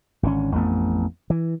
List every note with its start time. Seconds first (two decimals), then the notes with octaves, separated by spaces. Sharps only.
0.23 G#1 D3 D#3 C#4
0.55 A1 F2 A3 B3
1.30 E3